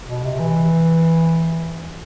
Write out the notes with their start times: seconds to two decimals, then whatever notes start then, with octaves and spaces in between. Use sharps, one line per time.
0.08 B2
0.24 C3
0.39 E3